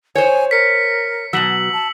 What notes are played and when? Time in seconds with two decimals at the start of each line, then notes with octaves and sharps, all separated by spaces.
0.15 C5 C#5 G#5
0.51 A#4 B6 C#7
1.33 B2 F#3 E6 B6 F#7
1.73 A5